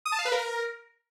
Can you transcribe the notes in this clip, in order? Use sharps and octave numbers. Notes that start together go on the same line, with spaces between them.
D#6
A5
F5
B4
A#4